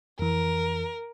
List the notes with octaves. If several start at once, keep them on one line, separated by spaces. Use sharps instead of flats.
F2 E3 A#4